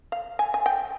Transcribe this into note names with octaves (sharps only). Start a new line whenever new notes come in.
F5
G#5
G#5
G5